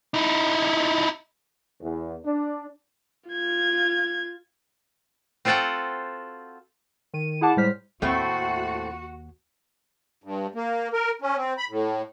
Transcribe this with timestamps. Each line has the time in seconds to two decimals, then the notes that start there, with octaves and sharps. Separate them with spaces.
0.14 D#4 E4
1.81 E2
2.24 D4
3.29 F4 G#6
5.45 C4 F4 F#4 A4 F#5 G5
7.13 D#3 D#7
7.41 E4 G#4 F#5 A5 D6
7.56 A2 G3 G#3 C5 F6 B6
8.02 D#2 A2 A3 C4 F#4
10.24 G2
10.55 A#3
10.93 A#4
11.22 C#4
11.37 C4
11.58 B5
11.70 A2